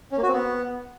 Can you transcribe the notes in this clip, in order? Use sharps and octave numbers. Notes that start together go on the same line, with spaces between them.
C#4
A#3
F#4
C4
B3